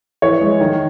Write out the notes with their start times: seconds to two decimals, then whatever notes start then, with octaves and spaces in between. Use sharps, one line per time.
0.22 E3 C#5
0.41 G#3
0.61 D#3